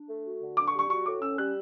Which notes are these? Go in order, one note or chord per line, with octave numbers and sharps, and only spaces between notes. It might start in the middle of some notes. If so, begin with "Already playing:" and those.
Already playing: D4
A3
F#4
D3
D4 D6
C#6
G3
C#6
F#4 C#6
A2 D6
C#4 E6
G3 F#6